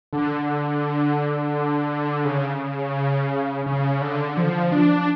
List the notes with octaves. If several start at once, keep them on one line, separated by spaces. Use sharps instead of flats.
D3
C#3
C#3
D3
F3
D4